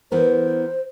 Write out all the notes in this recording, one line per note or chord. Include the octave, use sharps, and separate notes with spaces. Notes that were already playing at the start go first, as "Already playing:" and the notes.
E3 B3 A#4 C5